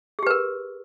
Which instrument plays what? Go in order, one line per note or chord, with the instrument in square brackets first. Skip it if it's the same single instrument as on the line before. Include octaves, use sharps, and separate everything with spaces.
[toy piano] G#4
G4
B4
A#4